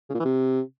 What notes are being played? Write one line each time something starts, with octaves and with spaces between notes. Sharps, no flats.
C#3
A#2
E3
C3